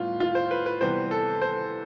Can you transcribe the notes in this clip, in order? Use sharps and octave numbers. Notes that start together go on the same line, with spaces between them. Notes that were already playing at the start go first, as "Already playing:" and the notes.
Already playing: A2 G3 B3 F4
F4
C5
B4
B4
C3 E3 G3 B3 C5
A4
C5